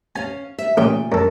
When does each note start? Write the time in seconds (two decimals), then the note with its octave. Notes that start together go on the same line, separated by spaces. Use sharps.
0.16 C#4 C#5 F5 G#5
0.58 E5
0.77 A1 A#2 C#3 G5
1.12 F#2 A4